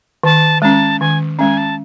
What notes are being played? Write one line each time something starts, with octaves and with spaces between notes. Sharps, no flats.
D#3 A5
G#3 C#4 A5
D#3 G#5
G#3 C#4 G#5
A5